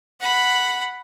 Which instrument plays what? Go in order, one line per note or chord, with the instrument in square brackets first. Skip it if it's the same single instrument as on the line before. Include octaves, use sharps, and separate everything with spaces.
[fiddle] F#5 B5